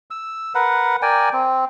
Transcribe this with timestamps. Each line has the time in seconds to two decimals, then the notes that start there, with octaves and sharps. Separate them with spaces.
0.11 E6
0.55 A#4 B4 F#5
1.02 A#4 D5 G5 G#5
1.33 C4